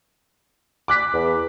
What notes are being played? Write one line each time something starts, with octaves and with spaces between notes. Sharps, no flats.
D6 F#6 B6
E2